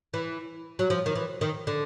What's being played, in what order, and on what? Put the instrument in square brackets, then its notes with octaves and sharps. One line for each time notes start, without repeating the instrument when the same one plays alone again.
[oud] E3
F#3
F3
D#3
E3
D#3
D3